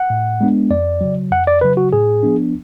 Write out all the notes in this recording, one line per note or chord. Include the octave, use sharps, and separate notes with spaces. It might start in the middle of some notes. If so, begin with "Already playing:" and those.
Already playing: F#5
A2
G#3 B3 D4
F2 D5
C#3 F#3
F2 F#5
D5
C#3 F#3 B4
F#4
A2 G#4
F3 B3 D4